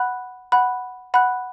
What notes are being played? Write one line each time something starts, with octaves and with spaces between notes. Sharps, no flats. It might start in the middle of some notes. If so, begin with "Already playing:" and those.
Already playing: F#5 B5 F#6
F#5 B5 F#6
F#5 B5 F#6